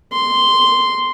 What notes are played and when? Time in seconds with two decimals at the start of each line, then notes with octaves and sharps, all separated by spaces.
0.13 C6